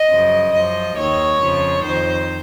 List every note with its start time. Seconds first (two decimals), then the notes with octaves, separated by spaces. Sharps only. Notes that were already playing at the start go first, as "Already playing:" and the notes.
Already playing: D#5
0.10 F#2 C#3 F3
0.53 F#2 F3 D#5
0.96 D#2 D#3 C#5
1.40 F2 C#3 F3
1.83 F2 D#3 C5